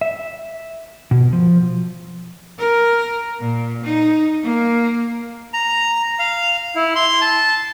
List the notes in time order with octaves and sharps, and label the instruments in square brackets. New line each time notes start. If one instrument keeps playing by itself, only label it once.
[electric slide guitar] E5
B2
F3
[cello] A#4
A#2
D#4
A#3
[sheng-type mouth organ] A#5
F5
E4
C6
A5